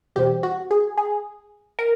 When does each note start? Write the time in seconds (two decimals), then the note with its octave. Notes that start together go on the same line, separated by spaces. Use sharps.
0.16 E2 B2 G3 C4 G4
0.43 F#4
0.71 G#4
0.98 G#4
1.79 A#4